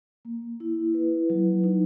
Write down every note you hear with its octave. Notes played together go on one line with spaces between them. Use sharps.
A#3
E4
B4
F#3
D#4